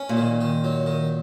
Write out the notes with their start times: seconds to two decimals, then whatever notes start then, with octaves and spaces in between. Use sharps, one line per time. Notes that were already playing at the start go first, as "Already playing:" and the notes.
Already playing: C#4
0.09 A#2
0.17 D#3
0.41 D#3
0.64 F#3
0.86 D#3